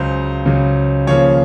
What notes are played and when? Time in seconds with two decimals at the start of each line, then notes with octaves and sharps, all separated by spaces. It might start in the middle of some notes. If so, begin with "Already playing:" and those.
Already playing: C#2 C#3 F#3 C5
0.45 C#2 C#3 F#3
1.07 D#2 C#3 F3 C#5